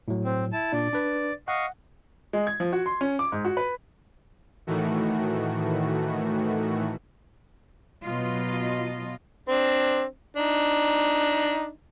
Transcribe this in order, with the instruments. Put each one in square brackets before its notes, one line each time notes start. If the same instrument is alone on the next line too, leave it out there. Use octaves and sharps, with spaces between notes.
[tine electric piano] A2 F#3
[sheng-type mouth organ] C4
E4 A5
[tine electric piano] A#2 D4 [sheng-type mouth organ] D5
[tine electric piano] D4 B4
[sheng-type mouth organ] D#5 F5 C#6 [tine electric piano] F#5
[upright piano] G#3
G#6
F3
F#4
C6
C#4
D6
G#2
F#4
B4
[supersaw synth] A2 D#3 E3 A3 F#4
[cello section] B2 F#3 F4 D#5
[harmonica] C4 D4
D4 D#4